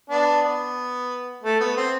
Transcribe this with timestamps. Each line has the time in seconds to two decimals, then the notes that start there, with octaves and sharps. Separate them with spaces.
0.10 B3 D4
0.43 B3
1.43 A3
1.61 B3
1.77 C4